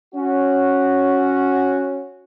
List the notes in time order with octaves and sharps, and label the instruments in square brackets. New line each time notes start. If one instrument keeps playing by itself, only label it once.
[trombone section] C#4 F#4